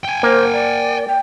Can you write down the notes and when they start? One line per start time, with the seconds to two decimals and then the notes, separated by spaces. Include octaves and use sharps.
0.05 G5 G#5
0.23 A#3 C5
0.53 D5
1.07 G5